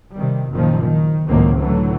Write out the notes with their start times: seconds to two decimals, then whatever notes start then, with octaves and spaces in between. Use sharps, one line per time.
0.14 C3 D#3 G3
0.51 F#1 A#2 D#3 F3
0.83 D#3
1.28 C#2 F#2 A2 D#3 A#3 C4
1.60 A2 D3 E3 F#3 A3